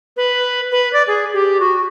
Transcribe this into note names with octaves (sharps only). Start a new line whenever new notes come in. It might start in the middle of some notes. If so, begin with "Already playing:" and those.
B4
B4
D5
G#4
G4
F#4